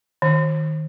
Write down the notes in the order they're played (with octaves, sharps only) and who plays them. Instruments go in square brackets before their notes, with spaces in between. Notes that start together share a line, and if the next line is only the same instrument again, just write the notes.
[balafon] D#3